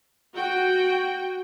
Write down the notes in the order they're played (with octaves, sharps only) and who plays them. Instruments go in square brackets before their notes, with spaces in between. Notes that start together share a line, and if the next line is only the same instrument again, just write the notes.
[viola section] F#4 G5